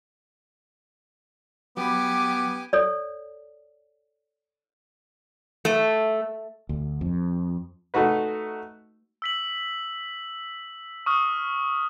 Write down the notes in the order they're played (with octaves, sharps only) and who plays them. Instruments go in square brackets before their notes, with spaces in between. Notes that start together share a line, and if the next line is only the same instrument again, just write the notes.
[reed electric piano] F#3 B5 [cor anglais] B3 [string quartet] G4 G#5 [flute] D6
[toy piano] A4 C#5 D5
[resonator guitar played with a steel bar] A3
[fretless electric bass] D2
F2
[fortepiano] A3 D#4 F#4 B4
[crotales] E6 B6 F#7
C#6 D#6 F6